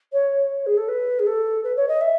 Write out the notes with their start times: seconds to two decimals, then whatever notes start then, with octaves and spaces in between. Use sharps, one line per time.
0.13 C#5
0.66 G#4
0.77 A4
0.88 B4
1.19 G#4
1.26 A4
1.64 B4
1.76 C#5
1.88 D#5
2.01 E5